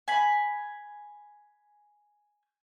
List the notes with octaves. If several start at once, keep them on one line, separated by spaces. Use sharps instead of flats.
G#5 B5